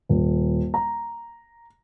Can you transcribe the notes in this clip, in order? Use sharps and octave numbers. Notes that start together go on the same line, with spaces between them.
D#1
A#5